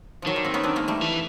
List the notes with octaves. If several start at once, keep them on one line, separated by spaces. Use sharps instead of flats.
D#3 F3 F#3
G3
A#3 C4
B3 C#4
C4 D4
G#3 A#3
G3 A3
E3